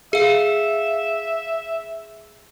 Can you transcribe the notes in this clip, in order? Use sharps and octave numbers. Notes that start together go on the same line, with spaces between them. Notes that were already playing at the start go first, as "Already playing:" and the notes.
G#4 E5 F5